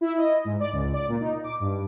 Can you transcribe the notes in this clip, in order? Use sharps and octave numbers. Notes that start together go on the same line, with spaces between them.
E4
D#5
G#2
D5
C#2
D5
A#2
D#4
D6
G2